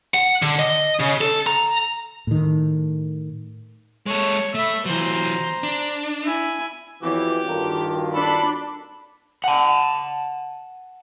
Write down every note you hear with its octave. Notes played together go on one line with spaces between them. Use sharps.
F#5
D3
D#5
C#3
A4
A#5
A2 D#3
G#3 A4 C#5
A3 E5 B5
E3 F#3 C5 A#5
D4
E4 G#5
F2 E3 B3 F#4 G4 C#5 D6
G2 D#3 F4 A4 A#4 F#5
F#4 G5
D4 A4 B5
F#5 A5